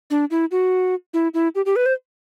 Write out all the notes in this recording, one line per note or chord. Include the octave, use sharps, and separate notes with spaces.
D4
E4
F#4
E4
E4
G4
G4
B4
C5